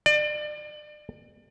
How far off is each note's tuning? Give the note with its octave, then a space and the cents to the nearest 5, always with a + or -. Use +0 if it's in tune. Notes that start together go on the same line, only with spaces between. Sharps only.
D5 +35